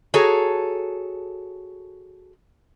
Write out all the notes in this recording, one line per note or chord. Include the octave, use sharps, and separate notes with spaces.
F#4 G#4 A4 C#5 A#5